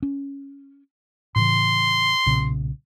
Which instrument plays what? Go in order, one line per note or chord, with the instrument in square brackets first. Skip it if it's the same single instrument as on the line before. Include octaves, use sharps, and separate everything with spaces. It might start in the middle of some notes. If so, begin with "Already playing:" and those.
[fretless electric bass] C#4
[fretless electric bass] A2 C#3 E3 [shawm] C6
[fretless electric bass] B1 A#2 C#3